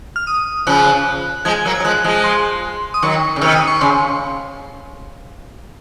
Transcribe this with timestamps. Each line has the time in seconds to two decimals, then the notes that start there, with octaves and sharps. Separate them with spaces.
0.16 F6
0.27 D#6
0.67 C#3 F3 F#6
1.45 F3 G#3 G#6
1.65 F#3 A#3
1.75 G#6
1.80 F#3
1.84 F3 G#3 F#6
2.04 F3 G#3
2.24 C6
2.94 D#6
3.02 D#3 F#3 C#6
3.36 C#3
3.41 C3 D#3 F6
3.56 D#6
3.68 C#6
3.81 C#3 C6